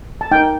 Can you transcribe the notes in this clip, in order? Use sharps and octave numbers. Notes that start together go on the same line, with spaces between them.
A5
D#4 A#4 G5